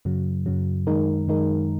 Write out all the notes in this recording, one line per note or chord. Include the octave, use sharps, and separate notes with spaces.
F#2 C#3 F#3
F#2 C#3 F#3
F#2 D#3 G#3 D#4 A#4
F#2 D#3 G#3 D#4 A#4